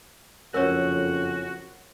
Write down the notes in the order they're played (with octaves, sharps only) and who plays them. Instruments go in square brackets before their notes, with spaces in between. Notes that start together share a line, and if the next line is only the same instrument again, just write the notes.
[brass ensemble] F#1 F2 [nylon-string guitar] C#4 [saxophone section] F#4 [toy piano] A#4 C#5